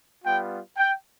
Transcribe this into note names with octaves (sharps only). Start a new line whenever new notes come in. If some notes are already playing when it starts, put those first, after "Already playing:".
G3 B3 F4 G5
G5